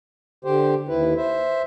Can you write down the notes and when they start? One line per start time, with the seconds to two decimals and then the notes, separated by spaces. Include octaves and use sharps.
0.45 D3 G4 C5
0.88 D#2 E4 B4
1.17 C5 E5